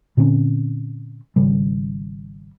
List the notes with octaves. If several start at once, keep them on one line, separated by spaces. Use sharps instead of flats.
A#2 D3 C4 C#4
G#1 C#3 G3